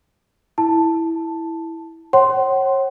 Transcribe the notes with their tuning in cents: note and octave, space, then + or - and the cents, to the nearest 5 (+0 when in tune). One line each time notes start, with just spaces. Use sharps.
E4 -5 A5 +0
C#5 -35 F#5 +40 C6 +0